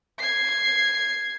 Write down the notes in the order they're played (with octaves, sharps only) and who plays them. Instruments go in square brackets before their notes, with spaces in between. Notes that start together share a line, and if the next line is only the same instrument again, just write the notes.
[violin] G#6 C7